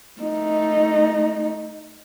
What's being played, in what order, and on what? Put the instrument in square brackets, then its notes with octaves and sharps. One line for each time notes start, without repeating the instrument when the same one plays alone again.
[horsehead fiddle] A3 D#4